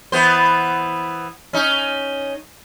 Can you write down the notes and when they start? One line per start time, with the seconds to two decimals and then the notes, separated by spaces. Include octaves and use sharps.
0.12 E3 B3 C5
1.53 C#4 D#4